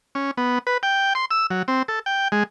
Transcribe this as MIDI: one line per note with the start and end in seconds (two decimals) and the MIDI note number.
0.15 0.31 61
0.37 0.59 59
0.67 0.78 71
0.83 1.13 79
1.15 1.25 84
1.31 1.47 88
1.51 1.63 54
1.68 1.83 60
1.88 1.99 69
2.06 2.28 79
2.32 2.43 56